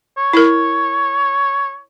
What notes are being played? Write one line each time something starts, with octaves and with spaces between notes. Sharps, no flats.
C#5
E4 A#4